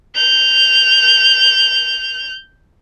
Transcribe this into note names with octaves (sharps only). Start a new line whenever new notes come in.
G6 F7